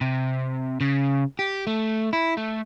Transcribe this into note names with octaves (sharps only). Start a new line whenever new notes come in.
C3
C#3
G4
A3
E4
A3